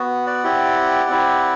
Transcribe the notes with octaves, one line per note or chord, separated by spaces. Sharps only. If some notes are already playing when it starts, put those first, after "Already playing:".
Already playing: B3 F#4
D5 F#5
C4 E4 G4
C4 E4 G4